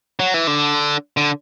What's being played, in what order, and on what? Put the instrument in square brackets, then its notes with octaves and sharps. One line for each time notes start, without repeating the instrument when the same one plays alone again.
[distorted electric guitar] F#3
E3
D3
D3